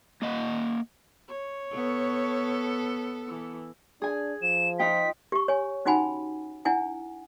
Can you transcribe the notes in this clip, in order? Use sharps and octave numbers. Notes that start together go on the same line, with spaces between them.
A#3 D#5 F#5
C#5
B3 A4
E3
D4 G#4 G#5
F3 E7
D#4 F4 G5 B6
G4 C#6
C#5 G#5
C#4 D#4 F#4 F#5 G#5 B5
D4 E4 F#5 G#5